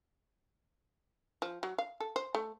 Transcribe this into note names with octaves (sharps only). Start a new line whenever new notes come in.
F3
F#3
F5
A4
C5
A3